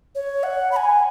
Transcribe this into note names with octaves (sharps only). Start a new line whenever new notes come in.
C#5
F#5
B5
G#5